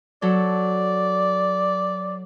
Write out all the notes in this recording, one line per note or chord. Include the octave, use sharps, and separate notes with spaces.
F#3 A4 D5